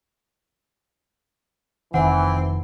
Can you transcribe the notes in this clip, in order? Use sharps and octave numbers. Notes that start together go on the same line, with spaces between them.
F1 D#3 E3 C4 F#5